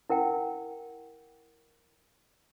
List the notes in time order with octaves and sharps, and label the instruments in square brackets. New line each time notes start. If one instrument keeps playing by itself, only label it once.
[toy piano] E4 A#4 F#5 G5